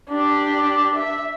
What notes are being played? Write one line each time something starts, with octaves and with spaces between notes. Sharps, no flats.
D4 G4
E5